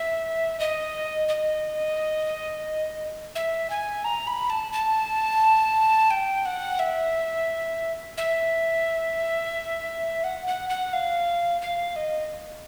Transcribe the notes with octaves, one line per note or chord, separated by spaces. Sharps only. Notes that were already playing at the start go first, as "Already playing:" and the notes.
Already playing: E5
D#5
D#5
E5
G#5
A#5
B5
A5
A5
G5
F#5
E5
E5
F#5
F#5
F#5
F5
F5
D#5